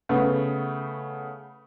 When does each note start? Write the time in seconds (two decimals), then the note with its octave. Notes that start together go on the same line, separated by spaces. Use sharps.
0.09 C#3 A3 B3